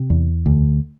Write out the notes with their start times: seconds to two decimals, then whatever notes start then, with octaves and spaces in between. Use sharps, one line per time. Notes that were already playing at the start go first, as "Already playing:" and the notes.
Already playing: C3
0.10 E2
0.46 D2